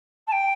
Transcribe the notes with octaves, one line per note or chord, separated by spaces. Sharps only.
A5
G5